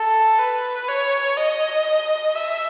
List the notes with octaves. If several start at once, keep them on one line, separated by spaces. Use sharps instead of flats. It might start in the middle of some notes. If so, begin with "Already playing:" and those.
Already playing: A4
B4
C#5
D#5
E5